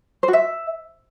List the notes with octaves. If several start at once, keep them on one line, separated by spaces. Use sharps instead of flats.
C5
F#4
E5